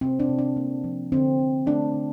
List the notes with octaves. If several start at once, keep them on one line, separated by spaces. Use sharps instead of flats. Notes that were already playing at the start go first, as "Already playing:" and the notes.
C3 C4
D4
C3
D4
A#3
F3
D3 C4
D3
A3 D4
D3